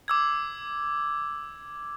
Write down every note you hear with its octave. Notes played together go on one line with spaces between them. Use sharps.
D6 E6 G#6